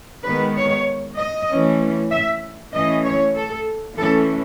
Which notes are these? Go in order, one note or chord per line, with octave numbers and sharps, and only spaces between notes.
D#3 G#3 B3 B4
C#5
D#5
E3 A3 C#4
E5
E3 A3 C#4 D#5
C#5
A4
E3 A3 C#4 A4